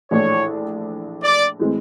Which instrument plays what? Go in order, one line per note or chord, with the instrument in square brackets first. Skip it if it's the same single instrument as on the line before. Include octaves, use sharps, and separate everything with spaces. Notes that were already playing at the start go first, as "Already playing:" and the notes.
[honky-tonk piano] A#1 A2 E3 A3 D4 [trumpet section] C#5
[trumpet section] D5
[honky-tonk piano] A2 E3 G#3 C4